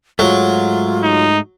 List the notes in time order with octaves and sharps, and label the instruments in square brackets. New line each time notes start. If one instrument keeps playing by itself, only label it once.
[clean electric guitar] G#2 G#3 A3 [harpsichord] F#3 [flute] F4
[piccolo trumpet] D#4